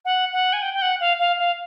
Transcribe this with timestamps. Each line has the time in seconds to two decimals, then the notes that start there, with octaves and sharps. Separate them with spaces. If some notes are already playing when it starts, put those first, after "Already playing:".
0.05 F#5
0.33 F#5
0.53 G#5
0.62 G5
0.74 G5
0.82 F#5
1.00 F5
1.19 F5
1.38 F5